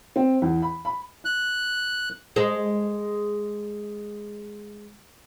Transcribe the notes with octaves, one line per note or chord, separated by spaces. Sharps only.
C4
E2
B5
B5
F#6
G#3 C5